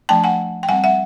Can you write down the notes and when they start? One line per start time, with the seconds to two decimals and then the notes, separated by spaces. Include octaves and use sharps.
0.09 F3 A3 D4 G5 A5
0.24 F#5 G#5
0.63 G5
0.69 G3 F#5 G#5
0.72 C4
0.84 E5 F#5